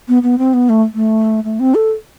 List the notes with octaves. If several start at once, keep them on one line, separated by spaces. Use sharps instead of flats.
B3
B3
C4
B3
A3
A3
A3
C4
A4